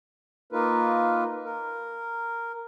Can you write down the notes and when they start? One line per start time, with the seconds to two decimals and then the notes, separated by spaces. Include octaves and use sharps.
0.53 A#3 D#4 F4 A#4 B4
1.44 A#4